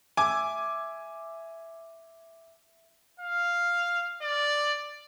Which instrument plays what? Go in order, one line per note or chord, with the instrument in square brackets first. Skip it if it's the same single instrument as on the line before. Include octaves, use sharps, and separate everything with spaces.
[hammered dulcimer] E5 [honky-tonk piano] G#5 D6
[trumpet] F5
D5